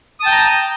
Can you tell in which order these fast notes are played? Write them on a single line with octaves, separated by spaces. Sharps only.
D#6 A5 G5 G6 A#5